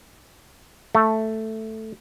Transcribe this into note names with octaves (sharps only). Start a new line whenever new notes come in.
A3